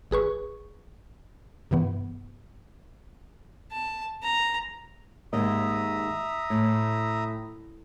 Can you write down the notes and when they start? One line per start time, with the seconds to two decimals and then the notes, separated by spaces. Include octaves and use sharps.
0.11 G#1 G#4 B4 C#6
1.71 G2 C3 E3 B3
3.72 A5
4.23 A#5
5.33 D#2 G#2 D#5 E5 A#5 D#6
6.50 A2